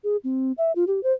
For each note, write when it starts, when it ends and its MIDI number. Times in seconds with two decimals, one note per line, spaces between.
0.04 0.17 68
0.24 0.52 60
0.58 0.72 76
0.76 0.84 65
0.87 1.02 67
1.03 1.12 72